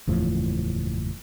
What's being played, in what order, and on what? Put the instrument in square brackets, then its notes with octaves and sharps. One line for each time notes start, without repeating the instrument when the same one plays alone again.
[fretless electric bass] F#1 E2 A2 F3